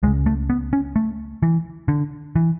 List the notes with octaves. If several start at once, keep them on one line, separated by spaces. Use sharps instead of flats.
C#2 C#3 G#3
A3
B3
C#4
A3
E3
D3
E3